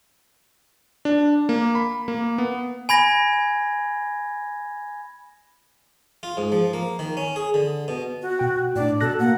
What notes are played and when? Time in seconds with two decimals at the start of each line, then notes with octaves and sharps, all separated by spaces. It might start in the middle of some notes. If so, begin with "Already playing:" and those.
1.05 D4
1.49 A#3
1.75 B5
2.08 A#3
2.38 B3
2.89 G#5 B5 G#6 A#6
6.23 F4
6.37 G#2
6.52 F3
6.73 A#3
6.99 D#3
7.17 C#4
7.36 G#4
7.54 D3
7.88 B2
8.22 F#4
8.39 B2 G5
8.76 A2 D4 D5
9.01 B2 A4 F#6 A#6
9.20 A#3 F#5